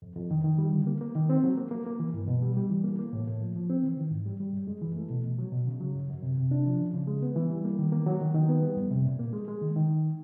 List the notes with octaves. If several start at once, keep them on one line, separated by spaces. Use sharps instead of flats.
F2
F2
D#3
D#3
G3
D3
A#3
A#3
D#3
C4
F#3
A#3
A#3
A#3
E3
G2
B2
G3
G3
E3
A#3
A#3
A2
A2
F3
F3
C4
E3
D#3
G#2
G3
G3
F#2
G#3
E3
A3
B2
B2
F#3
B2
C#3
F#3
F#2
F#2
C3
C3
D4
F3
C#3
C#3
G#3
B3
E3
G3
A#3
D#3
A#3
F#3
D#3
D#3
B3
G3
F2
C3
A#2
A#3
G#3
G#3
D#3
D#3